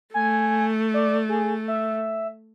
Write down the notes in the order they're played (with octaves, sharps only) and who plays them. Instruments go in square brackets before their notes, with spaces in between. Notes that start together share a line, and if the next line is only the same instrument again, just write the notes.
[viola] A3 [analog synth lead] G#5
[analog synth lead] D5
G#4
E5